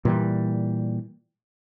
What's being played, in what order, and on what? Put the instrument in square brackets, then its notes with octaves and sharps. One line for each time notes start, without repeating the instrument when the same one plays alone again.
[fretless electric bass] A#2 E3 G3